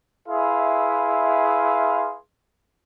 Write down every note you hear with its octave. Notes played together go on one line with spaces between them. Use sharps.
E4 G#4 B4 E5 F5 C6